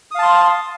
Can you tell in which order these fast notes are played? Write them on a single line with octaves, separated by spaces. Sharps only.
D#6 F5 A5 C6